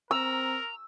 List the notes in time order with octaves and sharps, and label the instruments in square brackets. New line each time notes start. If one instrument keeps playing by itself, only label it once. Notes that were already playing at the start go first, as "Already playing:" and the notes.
[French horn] C4 [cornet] A#4 [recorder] A#5 [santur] E6